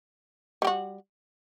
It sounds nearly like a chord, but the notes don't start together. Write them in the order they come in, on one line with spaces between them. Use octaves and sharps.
G3 G4 F#4